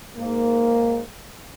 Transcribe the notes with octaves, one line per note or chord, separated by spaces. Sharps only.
G#2 A#3